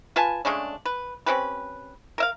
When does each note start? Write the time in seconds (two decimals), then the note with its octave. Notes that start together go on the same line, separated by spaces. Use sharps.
0.16 F4 B4 G#5 A5
0.45 C#3 G#3 A3 D4
0.85 B4
1.26 C4 C#4 G4 B4
2.18 A#4 E5 F5